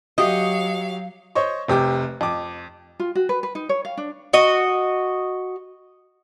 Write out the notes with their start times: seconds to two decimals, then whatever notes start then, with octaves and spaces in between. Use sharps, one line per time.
0.18 F#3 F#4 G4 D#5 F5
1.35 C5 C#5 D#5 C#6
1.68 F1 C3 G4 D6
2.21 F2 D6
3.00 F4
3.15 F#4
3.29 B4
3.43 B4
3.55 D#4
3.69 C#5
3.85 F5
3.97 D4
4.33 F#4 D#5